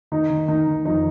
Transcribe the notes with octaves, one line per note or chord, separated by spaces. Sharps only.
D#3 D#4
D#3
D#3 D#4
D#3
F2 D#4